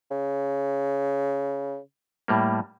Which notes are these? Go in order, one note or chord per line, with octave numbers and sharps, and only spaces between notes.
C#3
A2 G3 A#3